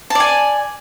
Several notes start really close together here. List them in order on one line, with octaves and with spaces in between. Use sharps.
A5 D5 G#5